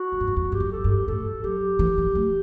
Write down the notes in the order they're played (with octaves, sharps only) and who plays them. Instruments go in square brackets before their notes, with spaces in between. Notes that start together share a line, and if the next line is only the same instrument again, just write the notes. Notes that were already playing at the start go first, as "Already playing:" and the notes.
Already playing: [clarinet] F#4
[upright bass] F#2
G2
F#2
[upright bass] E2 [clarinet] F#4
[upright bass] G2 [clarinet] G4
[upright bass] F#2
[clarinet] A4
[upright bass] G2
[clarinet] G4
[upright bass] A2 [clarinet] A4
[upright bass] F#3 [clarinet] G4
[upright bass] E3
F#3
A3